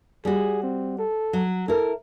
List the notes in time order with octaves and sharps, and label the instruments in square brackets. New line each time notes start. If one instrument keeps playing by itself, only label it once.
[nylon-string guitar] G3 F#4 [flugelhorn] G#4
[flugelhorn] C4
A4
[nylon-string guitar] F#3
[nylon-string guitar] E4 A#4 [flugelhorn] A4